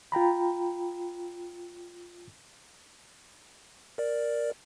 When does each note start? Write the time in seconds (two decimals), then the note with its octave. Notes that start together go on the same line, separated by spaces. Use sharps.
0.12 F4 G5 A#5 B5
3.98 A#4 D5